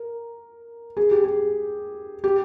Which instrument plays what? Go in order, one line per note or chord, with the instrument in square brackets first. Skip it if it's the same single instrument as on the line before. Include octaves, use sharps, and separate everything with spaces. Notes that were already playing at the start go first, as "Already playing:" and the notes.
Already playing: [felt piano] A#4
G#4
G4
G#4
G4